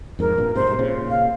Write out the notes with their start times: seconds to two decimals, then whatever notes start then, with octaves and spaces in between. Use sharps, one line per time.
0.19 F2 G#2 A#4
0.37 G2 A#2
0.55 G#2 C3 C5
0.67 G#2 C3
0.79 A#2 C#3
1.10 F5